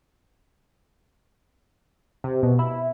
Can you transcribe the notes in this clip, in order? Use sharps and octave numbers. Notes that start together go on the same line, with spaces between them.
C3
B2
E4